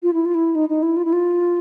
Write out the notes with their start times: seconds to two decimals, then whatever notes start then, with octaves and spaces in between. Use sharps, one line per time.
0.03 F4
0.13 E4
0.25 F4
0.34 E4
0.55 D#4
0.69 D#4
0.83 E4
0.97 F4
1.05 E4
1.13 F4